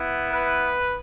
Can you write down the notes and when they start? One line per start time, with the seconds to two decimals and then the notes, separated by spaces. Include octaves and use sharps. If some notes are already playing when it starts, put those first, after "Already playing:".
Already playing: B3 E4
0.30 B4